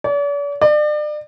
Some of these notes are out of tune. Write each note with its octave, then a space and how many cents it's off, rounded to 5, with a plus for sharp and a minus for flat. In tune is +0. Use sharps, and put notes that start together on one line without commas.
D5 -45
D5 +35